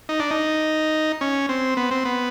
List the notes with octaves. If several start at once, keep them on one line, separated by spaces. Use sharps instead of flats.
D#4
D4
D#4
C#4
C4
B3
C4
B3